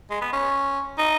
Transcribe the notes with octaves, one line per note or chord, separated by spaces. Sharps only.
G#3
B3
C#4
D#4